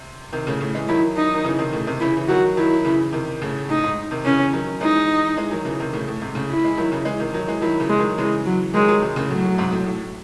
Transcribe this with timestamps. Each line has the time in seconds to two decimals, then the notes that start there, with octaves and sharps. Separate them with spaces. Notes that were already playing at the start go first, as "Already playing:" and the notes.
Already playing: C3
0.33 C3 D#3
0.47 A2 C#3
0.60 A2 C#3
0.75 E3 G#3
0.88 D#3 F#3 E4
1.16 D#4
1.34 D#3
1.44 C#3 E3
1.59 C3 D#3
1.72 A2 C#3
1.87 C3 D#3
2.01 C#3 E3 E4
2.17 E3
2.28 D#3 F#3 F#4
2.57 D#3 F#3 E4
2.85 C#3 E3
3.12 C3 D#3
3.42 A2 C#3
3.69 A2 D#4
3.84 G#2
4.11 C3 D#3
4.25 C#3 E3 C#4
4.53 D#3 F#3
4.81 E3 G#3 D#4
5.37 E3 G#3
5.51 D#3 F#3
5.65 C#3 E3
5.80 C3 D#3
5.93 A2 C#3
6.08 A2
6.21 G#2 C3
6.35 A2 C#3
6.50 E4
6.64 E3 G#3
6.78 D#3 F#3
6.92 C#3 E3
7.05 E3 G#3
7.20 C3 D#3
7.33 D#3 F#3
7.48 E3 G#3
7.61 D#3 F#3 E4
7.80 C#3 E3
7.90 G#3
7.99 D#3 F#3
8.18 C#3 E3 G#3
8.46 F#3
8.74 D#3 F#3 G#3
8.88 D#3 F#3
9.01 C3 D#3
9.16 A2 C#3
9.30 A2 F#3
9.44 A2
9.58 G#2 C3
9.72 A2
9.86 A2